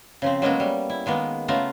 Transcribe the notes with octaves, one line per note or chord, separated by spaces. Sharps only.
C#3 F3 C4
F#3 G#3 A#3 B3 C#4 F#4
G3
E4
D#3 G#3 A#3 B3
C#3 A3 B3 F4 A#5